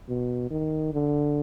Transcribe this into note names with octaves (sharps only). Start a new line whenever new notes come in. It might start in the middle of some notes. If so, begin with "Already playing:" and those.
B2
D#3
D3